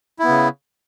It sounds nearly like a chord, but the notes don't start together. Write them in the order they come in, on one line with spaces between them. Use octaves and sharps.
E4 B3 C#3